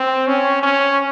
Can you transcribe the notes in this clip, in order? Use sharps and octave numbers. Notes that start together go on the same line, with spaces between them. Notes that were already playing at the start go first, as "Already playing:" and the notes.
Already playing: C4
C#4
C#4